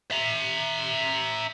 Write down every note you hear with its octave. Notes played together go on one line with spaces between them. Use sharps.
E5 A#5